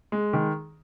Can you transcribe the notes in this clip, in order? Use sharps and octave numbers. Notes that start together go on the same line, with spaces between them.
G#3
D#3